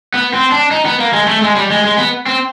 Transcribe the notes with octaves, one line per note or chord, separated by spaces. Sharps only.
B3
C4
D4
D#4
B3
A#3
G#3
A3
G#3
G3
G#3
G#3
B3
C4